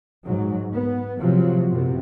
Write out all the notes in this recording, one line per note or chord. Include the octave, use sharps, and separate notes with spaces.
G#2 F#3
B3
A2 C3 F3 F#3
F#2 C3 B3